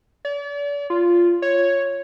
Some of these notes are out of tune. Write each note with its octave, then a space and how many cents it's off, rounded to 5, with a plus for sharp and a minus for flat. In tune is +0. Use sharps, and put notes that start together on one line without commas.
D5 -40
F4 -5
C#5 +0